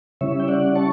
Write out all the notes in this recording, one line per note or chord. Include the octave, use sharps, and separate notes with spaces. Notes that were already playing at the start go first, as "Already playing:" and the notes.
C#3 G3 C#4 E4 C#5 E5
G5
D5 F#5
A5 C#6